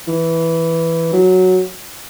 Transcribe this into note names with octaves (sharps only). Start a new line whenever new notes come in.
E3
F#3